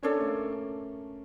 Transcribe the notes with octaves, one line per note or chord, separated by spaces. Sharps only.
C#4 D4 A4 C#5
A#3
A3
A#3